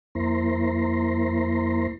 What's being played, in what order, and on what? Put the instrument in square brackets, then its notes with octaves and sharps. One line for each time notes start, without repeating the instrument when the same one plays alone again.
[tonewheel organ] F2 A#3 E4 C5 A#5 C6